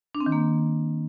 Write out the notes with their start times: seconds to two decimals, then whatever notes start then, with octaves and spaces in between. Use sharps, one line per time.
0.15 D4
0.20 C4
0.26 D#3
0.32 A#3